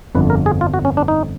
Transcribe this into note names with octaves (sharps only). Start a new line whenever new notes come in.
G1 F2 D3 F3 B4
A#4
G#4
F4
F#4
C#4
D4
D#4